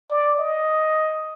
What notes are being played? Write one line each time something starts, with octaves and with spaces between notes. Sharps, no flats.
D5
D#5